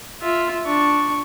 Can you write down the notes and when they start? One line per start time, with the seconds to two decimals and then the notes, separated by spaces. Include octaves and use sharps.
0.22 F4 E5
0.65 D4 C#6